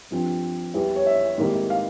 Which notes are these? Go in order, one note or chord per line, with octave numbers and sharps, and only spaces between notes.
G2 F3 C4
E2 E3 G3
C#5
E5
G#1 G#2 E3 G3 A#3
F5